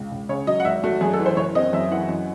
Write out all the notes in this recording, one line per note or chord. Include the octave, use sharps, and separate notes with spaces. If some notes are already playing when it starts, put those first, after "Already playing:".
Already playing: C#2
C#2
C#3 C#5
F#3 D#5
F#5
G#1 E5
A3 F#4
F#2 G#4
A4
E3
C5
F#1 C#5
C4 D#5
F#2 E5
E5
E3 F#5
F#2